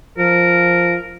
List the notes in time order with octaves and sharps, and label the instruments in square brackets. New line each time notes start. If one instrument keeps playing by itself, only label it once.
[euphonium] F3 [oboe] A#4